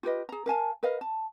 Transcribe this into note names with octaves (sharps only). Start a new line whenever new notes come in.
F4 G4 B4 D#5
G#4 A#5
A#4 F5 G#5 A5
A#4 B4 D#5 F5
A5